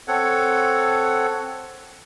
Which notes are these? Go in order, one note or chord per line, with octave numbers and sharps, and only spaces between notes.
C4 A4 C#5 F#5